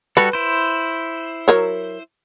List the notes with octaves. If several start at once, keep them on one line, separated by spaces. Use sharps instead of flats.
G3 F#4 A4 B4
E4 C5
F#3 A#4 C#5